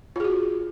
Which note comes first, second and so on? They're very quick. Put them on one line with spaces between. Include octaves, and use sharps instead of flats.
F4 G#4 F#4